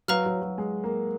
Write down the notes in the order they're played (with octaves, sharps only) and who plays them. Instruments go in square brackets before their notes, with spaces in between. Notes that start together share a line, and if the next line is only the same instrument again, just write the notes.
[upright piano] F#3 [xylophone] B4 F5 A#5 F6
[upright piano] F#3
F#3
G#3
A#3